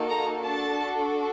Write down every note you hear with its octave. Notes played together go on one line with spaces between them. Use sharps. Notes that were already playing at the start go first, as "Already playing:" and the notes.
Already playing: A#3 D#4 F#4 A4
A#5
D4 F#4 A4 A5